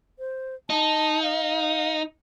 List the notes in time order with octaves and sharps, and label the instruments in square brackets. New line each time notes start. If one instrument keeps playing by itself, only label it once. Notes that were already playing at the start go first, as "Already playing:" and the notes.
[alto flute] C5
[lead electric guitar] D#4 [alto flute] A5
[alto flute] F5